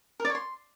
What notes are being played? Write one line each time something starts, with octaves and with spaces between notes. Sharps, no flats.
A#4
D5
C#5
C6